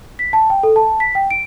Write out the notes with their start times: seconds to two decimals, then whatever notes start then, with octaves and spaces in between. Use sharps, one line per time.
0.19 B6
0.33 A5
0.50 G5
0.63 A4
0.76 A5
1.00 B6
1.15 G5
1.31 D7